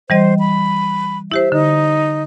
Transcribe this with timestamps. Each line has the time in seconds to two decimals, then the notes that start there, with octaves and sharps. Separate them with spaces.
0.10 E3 G3 C5 D#5
0.39 B5
1.32 E4 G4 C5 E5
1.52 D3 D#4